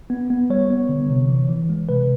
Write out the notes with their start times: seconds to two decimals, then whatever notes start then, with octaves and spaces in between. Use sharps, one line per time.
0.10 B3
0.30 B3
0.50 G3 C#5
0.70 B3
0.89 D3
1.10 C3
1.29 E3
1.49 E3
1.69 G#3
1.89 C3 B4